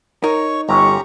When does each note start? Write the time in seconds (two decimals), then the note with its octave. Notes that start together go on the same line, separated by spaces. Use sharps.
0.24 D#4 A#4 C#5 C#6
0.69 G1 C#4 G4 A#5 C#6